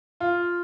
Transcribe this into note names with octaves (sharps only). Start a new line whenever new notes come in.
F4